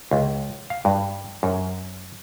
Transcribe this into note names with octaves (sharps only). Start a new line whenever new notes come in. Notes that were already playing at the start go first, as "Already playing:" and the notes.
C#2
F5
G2
F#2